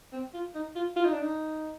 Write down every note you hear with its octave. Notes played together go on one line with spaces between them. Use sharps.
C4
F4
D#4
F4
F4
D#4
D4
D#4